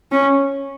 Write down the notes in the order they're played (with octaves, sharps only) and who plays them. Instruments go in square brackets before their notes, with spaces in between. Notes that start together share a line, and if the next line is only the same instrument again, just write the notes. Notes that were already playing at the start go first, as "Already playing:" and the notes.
[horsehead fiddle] C#4